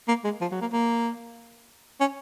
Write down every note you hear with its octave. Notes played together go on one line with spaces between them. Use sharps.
A#3
G#3
F3
F#3
A#3
A#3
C#4